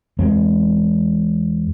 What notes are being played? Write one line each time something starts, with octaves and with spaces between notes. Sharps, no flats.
E2 G#3 C4